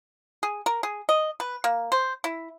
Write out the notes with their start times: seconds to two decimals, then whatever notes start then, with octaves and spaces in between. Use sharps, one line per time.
0.43 G#4
0.66 A#4
0.83 G#4
1.09 D#5
1.40 B4
1.64 A#3
1.92 C5
2.24 E4